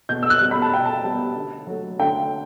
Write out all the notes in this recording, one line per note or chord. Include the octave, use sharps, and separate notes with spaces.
B2 G6
E6
F#6
G3 B3
B5
A5
B2 G5
A5
G3 B3
D3
F#3 A3
D3 G5